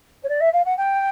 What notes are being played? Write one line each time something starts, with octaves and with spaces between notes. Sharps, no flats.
C#5
D5
E5
F5
F#5
G5